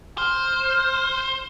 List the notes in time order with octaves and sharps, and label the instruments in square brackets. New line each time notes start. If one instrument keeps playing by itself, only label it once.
[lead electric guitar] C5 [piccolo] F6